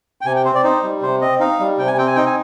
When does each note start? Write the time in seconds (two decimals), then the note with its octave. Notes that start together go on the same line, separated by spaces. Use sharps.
0.21 G5
0.26 C3 G#5
0.36 G5
0.45 C4 C5
0.55 D5
0.64 D#4 C5
0.83 G3
1.02 C3 C5
1.21 C4 D#5
1.40 D#4 F5
1.60 G3
1.78 C3 G5
1.87 G#5
1.98 C4 G5
2.07 G#5
2.16 D#4 G5
2.26 G#5